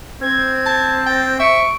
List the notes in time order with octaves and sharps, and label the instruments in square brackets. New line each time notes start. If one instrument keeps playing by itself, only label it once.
[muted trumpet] C4 [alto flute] C5 [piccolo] G#6
[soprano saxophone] A5
[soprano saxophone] G5 [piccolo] A6
[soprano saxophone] E5 [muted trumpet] C#6 [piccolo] D7